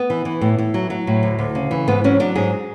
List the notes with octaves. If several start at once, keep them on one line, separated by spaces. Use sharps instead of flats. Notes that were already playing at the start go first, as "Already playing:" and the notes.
Already playing: B3
E3
E3
A2
A2
F#3
F#3
A2
D2
D2
C#3
E3
G#2 B3
F#3 C#4
F#3 D4
G#2 G#4